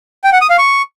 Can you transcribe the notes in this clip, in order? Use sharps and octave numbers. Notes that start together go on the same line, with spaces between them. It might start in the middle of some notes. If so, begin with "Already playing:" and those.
G5
F#5
D#6
F5
C#6